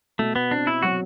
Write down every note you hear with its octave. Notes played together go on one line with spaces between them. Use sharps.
B2 A3
B3
C4 D4
E4
F#3 F#4